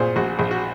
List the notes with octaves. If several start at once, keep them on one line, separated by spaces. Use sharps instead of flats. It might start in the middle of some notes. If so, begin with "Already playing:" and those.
Already playing: A#2 G#4 C5
A#1 F#4
A#1
F#4